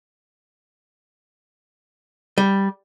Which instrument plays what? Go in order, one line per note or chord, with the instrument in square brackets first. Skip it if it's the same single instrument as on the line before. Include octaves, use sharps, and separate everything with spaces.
[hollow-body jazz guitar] G3